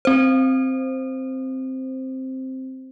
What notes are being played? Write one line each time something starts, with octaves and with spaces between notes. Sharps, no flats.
C4 C5